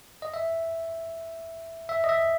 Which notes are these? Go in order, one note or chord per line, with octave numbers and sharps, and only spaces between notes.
D#5
E5
E5
D#5
E5